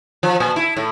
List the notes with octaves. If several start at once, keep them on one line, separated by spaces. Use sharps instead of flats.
F3
A#2
E4
A2